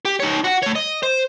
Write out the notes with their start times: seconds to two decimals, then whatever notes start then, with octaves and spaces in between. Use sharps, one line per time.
0.05 G4
0.20 D#4 C#5
0.44 F#4 F#5
0.62 A3 C#5
0.75 D#5
1.03 C5